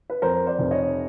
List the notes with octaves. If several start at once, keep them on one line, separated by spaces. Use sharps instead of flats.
B4
F2 A#4 C5
C5 D5
F1
C#5 D#5